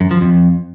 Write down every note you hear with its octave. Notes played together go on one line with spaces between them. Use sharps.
F#2
F3
F2